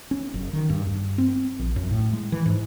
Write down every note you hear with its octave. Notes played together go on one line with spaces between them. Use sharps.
C#4
F#1
D#3
G2
G2
C4
A#1
F#2
A2
G#3
E3
G#2